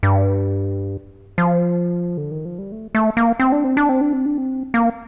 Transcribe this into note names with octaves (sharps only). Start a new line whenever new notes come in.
G2
F3
D3
D#3
F3
G3
A3
A3
A#3
C4
D4
C4
D4
C4
D4
C4
D4
C4
A#3